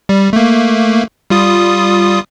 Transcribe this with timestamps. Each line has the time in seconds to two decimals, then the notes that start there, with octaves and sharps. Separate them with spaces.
0.09 G3
0.33 A3 A#3
1.30 G3 F4 D#6